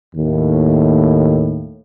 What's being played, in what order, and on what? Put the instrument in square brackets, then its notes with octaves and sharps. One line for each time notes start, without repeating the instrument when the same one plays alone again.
[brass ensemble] D#2 A2